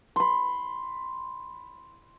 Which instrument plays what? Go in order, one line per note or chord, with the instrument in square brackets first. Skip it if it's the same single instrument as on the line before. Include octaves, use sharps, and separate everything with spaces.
[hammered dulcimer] B5 C6